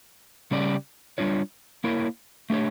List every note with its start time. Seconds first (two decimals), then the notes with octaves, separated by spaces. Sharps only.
0.51 C#3 G3 C#4 G4 D5
1.18 G3 D4 F4 C#5
1.84 A#3 E4 A#4 C#5
2.50 A3 D4 G4 C#5